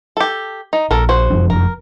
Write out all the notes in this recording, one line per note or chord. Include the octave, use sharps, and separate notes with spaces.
G4 A4
D#4
A#1 A4 A#4
F#4 C5
F#1 F2 D4
A#4